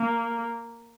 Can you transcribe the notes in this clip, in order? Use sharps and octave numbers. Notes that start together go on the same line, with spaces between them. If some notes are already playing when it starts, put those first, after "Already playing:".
Already playing: A#3